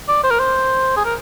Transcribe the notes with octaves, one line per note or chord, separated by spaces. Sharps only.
D5
C5
A#4
C5
G#4
A#4